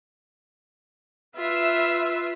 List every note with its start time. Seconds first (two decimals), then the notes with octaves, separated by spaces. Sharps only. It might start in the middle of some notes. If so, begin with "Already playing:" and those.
1.36 F4 B4 E5